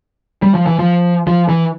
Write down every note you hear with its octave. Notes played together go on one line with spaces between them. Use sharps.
G3
F3
E3
F3
F3
E3